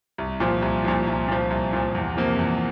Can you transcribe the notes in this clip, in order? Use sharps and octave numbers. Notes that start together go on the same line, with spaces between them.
C2
A#2 F3
C2
A#2 F3
C2
A#2 F3
C2
A#2 F3
E2
C3 F3 A#3
E2